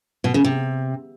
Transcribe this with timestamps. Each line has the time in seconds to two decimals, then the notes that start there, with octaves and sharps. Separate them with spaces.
0.24 B2
0.34 C#3
0.44 C3